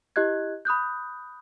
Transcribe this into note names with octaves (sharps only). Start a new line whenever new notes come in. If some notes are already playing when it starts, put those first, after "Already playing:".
E4 G4 D#5 F#6 G#6
B5 D#6 F#6 G6